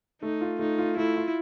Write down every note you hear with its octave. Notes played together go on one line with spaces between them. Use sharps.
A3 D#4
F4
A3 D#4
F4
A3 E4
F4